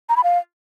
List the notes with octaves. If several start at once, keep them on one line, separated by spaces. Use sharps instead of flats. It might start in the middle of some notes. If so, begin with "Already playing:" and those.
A#5
B5
F5